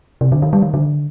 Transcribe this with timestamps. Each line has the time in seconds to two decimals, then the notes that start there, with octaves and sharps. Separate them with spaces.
0.21 C3
0.32 D3
0.42 D#3
0.53 G3
0.63 D#3
0.74 D3